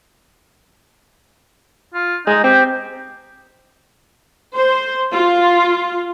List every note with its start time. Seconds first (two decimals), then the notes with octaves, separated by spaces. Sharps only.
1.94 F4
2.27 G#3 D#4
2.44 C4 G4
4.55 C5
5.13 F4